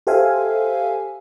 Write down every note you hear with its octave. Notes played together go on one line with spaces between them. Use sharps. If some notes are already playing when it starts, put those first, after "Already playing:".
G4 A4 C5 E5 F5 G#5